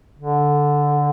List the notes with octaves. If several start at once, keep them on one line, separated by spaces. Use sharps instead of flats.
D3